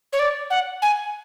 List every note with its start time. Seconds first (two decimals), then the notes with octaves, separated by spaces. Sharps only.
0.13 C#5
0.19 D5
0.50 F#5
0.82 G#5